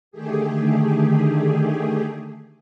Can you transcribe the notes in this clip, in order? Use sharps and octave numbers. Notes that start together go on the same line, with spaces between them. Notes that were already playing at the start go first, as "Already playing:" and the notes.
D3 D#3 A3 G4 G#4